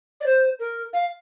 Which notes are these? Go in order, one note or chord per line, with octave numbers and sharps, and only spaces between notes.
D5
C5
A#4
F5